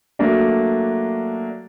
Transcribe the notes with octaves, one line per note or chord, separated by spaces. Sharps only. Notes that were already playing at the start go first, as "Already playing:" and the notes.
F#3 A3 A#3 D4